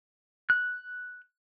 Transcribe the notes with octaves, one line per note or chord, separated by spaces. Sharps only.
F#6